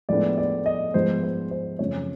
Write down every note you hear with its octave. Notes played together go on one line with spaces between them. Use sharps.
A2 F3 G#3 B3 D4 D5
D5
D#5
G#2 F3 G#3 B3 C5
C5
C5
F#2 C#3 F3 A3 C4 C#5